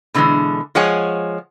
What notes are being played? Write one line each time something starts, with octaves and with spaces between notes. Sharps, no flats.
B2 D3 E3 F3 G#3
F3 G#3 C#5 F#5 G#5